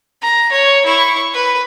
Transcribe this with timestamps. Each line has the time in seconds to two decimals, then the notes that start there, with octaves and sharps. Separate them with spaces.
0.22 A#5
0.52 C#5
0.85 E4 C#6
1.34 B4